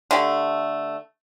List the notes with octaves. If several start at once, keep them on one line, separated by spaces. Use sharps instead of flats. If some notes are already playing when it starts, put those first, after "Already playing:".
D3 A3 G4